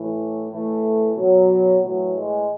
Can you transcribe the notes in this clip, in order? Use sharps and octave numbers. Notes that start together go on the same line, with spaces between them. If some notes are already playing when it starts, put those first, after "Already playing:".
Already playing: A2 E3
A2 E3 A3
B2 F#3
A2 E3 F#3
G#3